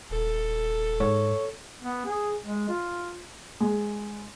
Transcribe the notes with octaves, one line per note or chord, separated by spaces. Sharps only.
D#1 A4
G#2 C#5
B3
G#4
G#3
F4
G#3